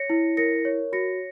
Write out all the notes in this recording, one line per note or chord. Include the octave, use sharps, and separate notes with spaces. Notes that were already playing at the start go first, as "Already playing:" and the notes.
Already playing: C#5 A#6 C#7
E4
A#4 A#6 C#7
C#5
F#4 A#6 C#7